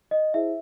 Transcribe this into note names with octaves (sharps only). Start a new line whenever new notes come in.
D#5
E4 G#4 C5 E5